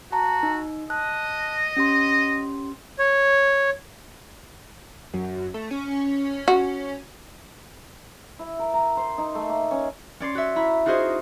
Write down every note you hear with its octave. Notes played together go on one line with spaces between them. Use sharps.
F#4 A5 A#5
D#4
D#5 A5 F#6
C#4 G4 C6
C#5
F#2
A3
C#4
F#4
E4
A#4
A#5
C5
D#4
A3
A#3
C#4
C#4 D5 C6 C7
F#4 E5
E4 A#5 B5
D#4 F4 F#4 G#4 C5 D#5